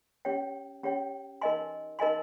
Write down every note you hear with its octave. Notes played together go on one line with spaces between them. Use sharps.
C#4 G4 C#5 G5
C#4 G4 C#5 G5
D#4 A#4 D#5 G#5 C6
D#4 A#4 D#5 G#5 C6